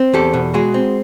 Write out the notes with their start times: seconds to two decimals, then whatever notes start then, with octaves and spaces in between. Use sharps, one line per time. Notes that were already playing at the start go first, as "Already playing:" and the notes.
Already playing: C4
0.13 E2 G4 A4
0.33 B2
0.54 G#3 F#4 G#4
0.74 C4